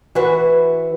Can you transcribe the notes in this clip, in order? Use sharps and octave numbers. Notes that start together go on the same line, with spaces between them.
E3 E4 F#4 B4 C5